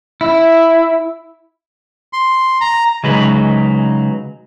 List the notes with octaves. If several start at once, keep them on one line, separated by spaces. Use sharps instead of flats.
E4
C6
A#5
C#3 F#3 G#3 D#4 G#4 B4